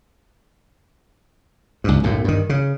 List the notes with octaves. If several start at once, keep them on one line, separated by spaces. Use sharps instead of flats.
C#2 G2
B1 F#2 A2
G2 D#3
C#3